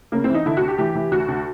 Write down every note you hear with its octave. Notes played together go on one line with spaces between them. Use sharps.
C#3 A#3
E3 C4
D#4
D3 E4
D2 F#4
G4
E3 G4
E3
D2 F#4
D2